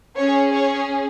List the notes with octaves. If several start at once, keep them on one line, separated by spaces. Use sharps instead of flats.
C#4 G#4 C#5
C#5